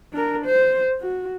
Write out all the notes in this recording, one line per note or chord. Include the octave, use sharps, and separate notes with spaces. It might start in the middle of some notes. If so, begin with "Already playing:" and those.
D4 A#4
C5
F#4